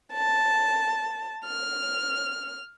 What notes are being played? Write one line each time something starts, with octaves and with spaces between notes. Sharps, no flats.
A5
F6